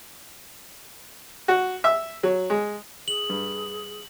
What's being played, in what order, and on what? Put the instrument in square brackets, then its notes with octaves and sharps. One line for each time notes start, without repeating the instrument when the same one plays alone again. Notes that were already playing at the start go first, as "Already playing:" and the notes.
[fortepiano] F#4
E5
F#3
G#3
[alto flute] G#4 [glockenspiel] F#7
[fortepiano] G2